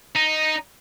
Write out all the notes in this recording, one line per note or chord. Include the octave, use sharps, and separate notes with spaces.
D#4